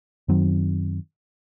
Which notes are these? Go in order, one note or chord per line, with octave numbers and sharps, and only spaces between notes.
F#2 D#3 F#3 C4